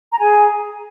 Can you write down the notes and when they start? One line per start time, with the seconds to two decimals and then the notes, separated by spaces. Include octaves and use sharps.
0.12 A#5
0.19 G#4 G#5